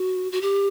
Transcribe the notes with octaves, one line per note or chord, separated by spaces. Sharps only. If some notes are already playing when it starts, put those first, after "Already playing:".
Already playing: F#4
F#4
G4